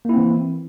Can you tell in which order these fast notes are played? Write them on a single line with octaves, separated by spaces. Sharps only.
A#3 E4 C4 E3